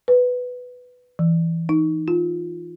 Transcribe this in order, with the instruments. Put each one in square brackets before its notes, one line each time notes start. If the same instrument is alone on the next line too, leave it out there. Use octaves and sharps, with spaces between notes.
[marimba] B4
E3
D#4
F4